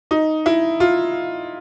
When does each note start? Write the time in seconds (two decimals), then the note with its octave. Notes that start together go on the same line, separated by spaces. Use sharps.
0.11 D#4
0.46 E4
0.80 F4